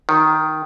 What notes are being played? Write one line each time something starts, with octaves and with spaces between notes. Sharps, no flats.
D#3